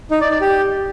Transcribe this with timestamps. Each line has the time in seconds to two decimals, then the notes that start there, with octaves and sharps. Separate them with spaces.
0.11 D#4
0.21 D5
0.31 D5
0.41 G4